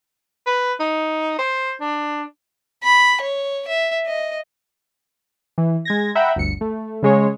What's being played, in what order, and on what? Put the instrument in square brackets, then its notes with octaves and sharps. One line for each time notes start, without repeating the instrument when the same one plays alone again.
[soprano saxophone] B4
D#4
C5
D4
[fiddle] B5
C#5
E5
D#5
[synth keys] E3
G#3 G#6 A#6
E5 F#5 G5 A#5 B5
G1 D2 C#7
A3
C#3 G#3 C#5